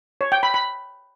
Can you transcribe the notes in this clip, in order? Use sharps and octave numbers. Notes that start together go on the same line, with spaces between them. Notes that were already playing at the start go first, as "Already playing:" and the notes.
C#5
G5
B5
B5